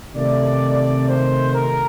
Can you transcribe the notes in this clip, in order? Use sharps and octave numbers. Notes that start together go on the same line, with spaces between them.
C3 D#3 A3 D5
C5
A#4